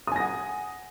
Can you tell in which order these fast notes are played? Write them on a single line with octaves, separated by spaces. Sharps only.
D#6 G#5 A#6 F#5